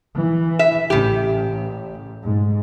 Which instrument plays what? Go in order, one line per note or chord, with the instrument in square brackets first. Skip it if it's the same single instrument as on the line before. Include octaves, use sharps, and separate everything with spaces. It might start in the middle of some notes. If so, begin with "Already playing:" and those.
[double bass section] E3
[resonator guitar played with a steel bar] E5
[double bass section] A1 [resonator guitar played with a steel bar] C#3 G4
[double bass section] G#2